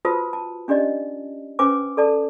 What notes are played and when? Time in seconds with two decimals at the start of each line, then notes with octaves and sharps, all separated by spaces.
0.05 F4 F#4 B4 C5 A5 D#6
0.33 A5
0.68 C#4 D4 G4 D5 D#5
1.59 C#4 B4 C5 G#5 D6
1.97 A4 D5 A5